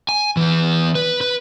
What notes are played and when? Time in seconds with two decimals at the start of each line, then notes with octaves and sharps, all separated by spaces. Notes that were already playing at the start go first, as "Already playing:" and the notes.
0.09 G#5
0.37 E3 B3
0.95 B4
1.21 B4